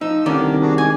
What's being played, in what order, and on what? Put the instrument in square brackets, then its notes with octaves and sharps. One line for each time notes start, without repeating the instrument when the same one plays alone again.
[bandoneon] F3 E6 [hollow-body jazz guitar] D#4
[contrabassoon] C2 [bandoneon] D3 D4 A#4 [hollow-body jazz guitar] D#3 C#4 [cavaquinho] D5
[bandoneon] D4 F#4 G#4
[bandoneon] G#3 G#4 [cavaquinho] G#5 D6